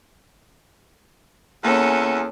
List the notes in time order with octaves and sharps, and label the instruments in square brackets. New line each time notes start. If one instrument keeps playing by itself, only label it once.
[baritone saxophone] E2 [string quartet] A#3 C#4 A4